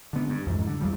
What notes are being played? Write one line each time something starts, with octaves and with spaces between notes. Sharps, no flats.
D3 B3
G2
F2 G#2 E3
G2 D3
E2 F3 G3